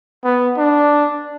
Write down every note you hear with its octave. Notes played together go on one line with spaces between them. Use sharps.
B3
D4